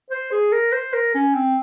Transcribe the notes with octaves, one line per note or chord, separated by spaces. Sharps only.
C5
G#4
A#4
C5
A#4
C#4
C4